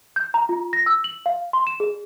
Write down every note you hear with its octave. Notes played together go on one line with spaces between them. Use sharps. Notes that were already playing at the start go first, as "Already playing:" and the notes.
G6
A#5
F4
A#6
E6
F#7
F5
C6
E7
G#4